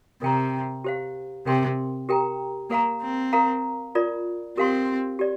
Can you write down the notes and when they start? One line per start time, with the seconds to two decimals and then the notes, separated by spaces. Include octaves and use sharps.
0.22 C3 A#4 G5 A#5
0.84 G4 C5 F5
1.46 C3 A#4 G5 C6
2.09 G4 A#4 G5 A#5
2.70 A#3 A#4 F5 A#5
3.02 C4
3.33 A#4 F5 A#5
3.95 F4 A#4 D5
4.57 C4 G4 A#4 F5 C6
5.19 G4 D5